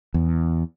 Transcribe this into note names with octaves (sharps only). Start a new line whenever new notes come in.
E2